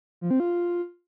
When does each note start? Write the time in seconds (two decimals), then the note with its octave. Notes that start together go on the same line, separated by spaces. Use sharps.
0.21 F3
0.31 C4
0.40 F4